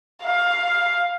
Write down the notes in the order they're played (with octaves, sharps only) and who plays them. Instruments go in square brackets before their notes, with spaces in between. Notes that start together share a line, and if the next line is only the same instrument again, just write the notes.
[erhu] F5